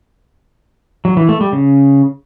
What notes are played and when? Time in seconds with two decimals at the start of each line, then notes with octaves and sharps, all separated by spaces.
1.05 F#3
1.17 E3
1.29 A3
1.41 G3
1.53 C#3